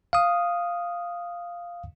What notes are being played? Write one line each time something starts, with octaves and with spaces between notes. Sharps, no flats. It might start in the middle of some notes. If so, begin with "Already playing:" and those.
F5 D#6